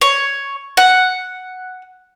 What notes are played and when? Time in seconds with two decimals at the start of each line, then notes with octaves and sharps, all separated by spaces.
0.01 C#5
0.77 F#5